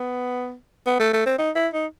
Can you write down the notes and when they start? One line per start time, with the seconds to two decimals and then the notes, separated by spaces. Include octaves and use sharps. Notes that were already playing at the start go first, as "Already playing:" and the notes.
Already playing: B3
0.86 B3
1.00 A3
1.13 A3
1.26 C4
1.39 D#4
1.56 E4
1.74 D#4